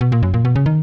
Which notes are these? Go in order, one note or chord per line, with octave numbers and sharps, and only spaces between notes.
B2
A#2
F#2
A#2
B2
C#3
D#3